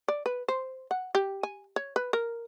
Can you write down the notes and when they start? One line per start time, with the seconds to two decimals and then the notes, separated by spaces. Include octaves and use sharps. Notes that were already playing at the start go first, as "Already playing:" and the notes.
0.08 D5
0.26 B4
0.48 C5
0.91 F#5
1.15 G4
1.43 G#5
1.76 C#5
1.96 B4
2.13 A#4